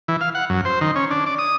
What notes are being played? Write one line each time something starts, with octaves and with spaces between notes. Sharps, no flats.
E3
F5
F#5
F#2
C5
D#3
C#4
D4
D5
D#6